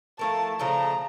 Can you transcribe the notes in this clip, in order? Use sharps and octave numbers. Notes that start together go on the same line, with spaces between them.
F3 A3 E4 A#4 A5
C#3 F3 A3 D4 A#5